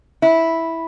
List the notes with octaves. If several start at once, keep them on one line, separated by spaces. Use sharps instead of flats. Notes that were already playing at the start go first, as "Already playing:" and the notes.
E4